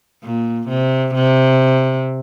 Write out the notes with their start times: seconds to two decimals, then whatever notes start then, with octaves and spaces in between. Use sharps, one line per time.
0.23 A#2
0.69 C3
1.15 C3